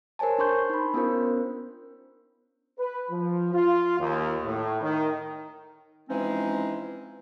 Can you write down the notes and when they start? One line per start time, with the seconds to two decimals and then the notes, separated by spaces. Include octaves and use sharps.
0.19 A#4 C5 C#5 G#5 A5
0.38 D4 C5 C6 C#6 G6
0.70 D#4 B5
0.94 B3 C#4 D4 F4 A#4 C5
2.79 B4
3.10 F3
3.53 F4
4.00 D#2
4.44 A2
4.82 D#3
6.09 E3 F3 G#3 C4 C#4 D#4